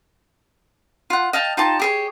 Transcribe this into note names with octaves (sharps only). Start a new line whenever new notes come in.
F4 F#5
D#5 F5 G5 A5
D#4 F4 G4 A5
G4 G#4 C#5